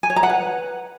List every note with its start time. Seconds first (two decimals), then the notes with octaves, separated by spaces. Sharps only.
0.03 G#5
0.10 C#5
0.16 A#5
0.23 F#5
0.30 B4